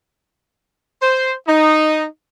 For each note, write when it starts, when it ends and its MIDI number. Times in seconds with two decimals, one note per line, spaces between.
1.02 1.32 72
1.48 2.05 63